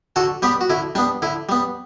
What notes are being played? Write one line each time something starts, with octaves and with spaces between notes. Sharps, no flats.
D3 F#4 A4
G3 B3 G4 B4
F#4
D3 E4
G3 B3 D4
D3 E4
G3 B3